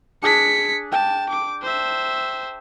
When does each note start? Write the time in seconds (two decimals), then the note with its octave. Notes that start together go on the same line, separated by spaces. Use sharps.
0.22 D4 G#4 B6 C#7
0.92 G5 A5
1.30 D6
1.63 C5 E5